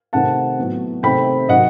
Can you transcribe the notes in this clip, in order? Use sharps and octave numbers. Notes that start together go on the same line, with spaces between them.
C3 D#3 A3 C4 F#5 A5
A2 F#3 B3
C3 D#3 A3 C4 G5 B5
C3 D#3 F#3 D#5 F#5